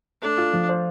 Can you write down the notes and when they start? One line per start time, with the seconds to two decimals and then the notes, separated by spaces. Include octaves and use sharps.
0.22 A3 D4
0.38 F4
0.53 F3
0.69 C5